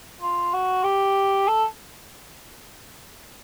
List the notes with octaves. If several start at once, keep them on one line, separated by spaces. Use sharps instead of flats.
F4
F#4
G4
A4